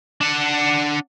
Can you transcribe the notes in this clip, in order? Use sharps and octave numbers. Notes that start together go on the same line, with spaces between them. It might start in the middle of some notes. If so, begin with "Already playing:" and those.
D4 F#5